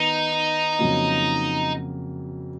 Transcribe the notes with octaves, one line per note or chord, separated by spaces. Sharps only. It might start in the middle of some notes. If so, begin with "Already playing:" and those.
Already playing: D#3 B3 D#4
F2 C#3 F#3 A#3